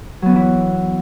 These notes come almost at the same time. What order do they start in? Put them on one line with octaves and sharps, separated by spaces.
F#3 B3 C#4 E3 E4